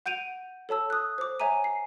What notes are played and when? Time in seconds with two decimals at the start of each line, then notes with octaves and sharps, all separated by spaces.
0.06 F#5 G6 D7 D#7 F7
0.69 A4 C#5 A5 E6
0.90 D#6 F#6
1.18 C5 D6
1.40 C#5 E5 G#5 A#5 D#7
1.64 C7